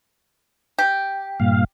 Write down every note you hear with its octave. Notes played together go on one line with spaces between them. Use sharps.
G4
G2 A#2 F5